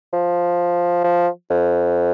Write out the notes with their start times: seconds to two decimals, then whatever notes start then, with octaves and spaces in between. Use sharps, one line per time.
0.13 F3
1.04 F3
1.50 F2